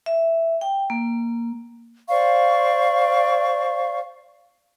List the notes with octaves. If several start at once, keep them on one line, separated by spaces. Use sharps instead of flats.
E5
G5
A#3
C5 D5 F5 C#6